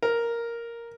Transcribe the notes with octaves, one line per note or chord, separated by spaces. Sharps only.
A#4